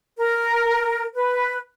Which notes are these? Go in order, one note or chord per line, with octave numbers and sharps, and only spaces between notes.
A#4
B4